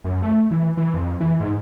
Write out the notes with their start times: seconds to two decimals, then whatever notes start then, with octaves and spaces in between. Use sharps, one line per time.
0.04 F#2
0.22 A3
0.51 E3
0.77 E3
0.94 F2
1.20 E3
1.40 G#2